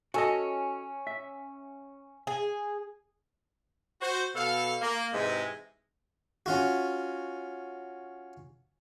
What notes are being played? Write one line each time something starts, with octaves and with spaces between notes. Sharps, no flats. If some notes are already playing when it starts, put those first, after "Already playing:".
C#4 F#4 A4 D#5
E5
G#4
F#4 C5
B2 A4 F5
A#3
G#2 C3 E3 G#3
C#4 F4 F#4